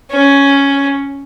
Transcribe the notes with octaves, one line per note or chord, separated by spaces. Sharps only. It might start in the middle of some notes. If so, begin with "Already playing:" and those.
C#4